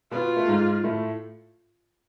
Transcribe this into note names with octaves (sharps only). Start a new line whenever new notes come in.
B2 B3 F4
A3
G#2 G#3
A2 A3